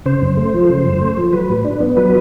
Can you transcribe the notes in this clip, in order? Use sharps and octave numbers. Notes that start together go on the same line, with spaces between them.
C#3 C5
F#2
A3
F3
C#3
F#2
A3
F3
F#3 B4
A2
D4
B3
F#3 B4